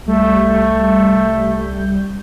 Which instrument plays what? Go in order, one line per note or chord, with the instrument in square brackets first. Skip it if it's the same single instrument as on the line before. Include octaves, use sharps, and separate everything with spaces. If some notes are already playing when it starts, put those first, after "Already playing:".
[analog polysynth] C2 G3 G6 [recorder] A3